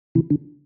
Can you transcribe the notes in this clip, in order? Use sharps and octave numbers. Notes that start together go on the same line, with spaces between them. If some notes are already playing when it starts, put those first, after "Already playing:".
C3 E3
D3